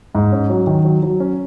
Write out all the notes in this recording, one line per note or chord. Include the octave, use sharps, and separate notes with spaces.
G#2
C#4
F#3
D#3
F#3
F#3
C#4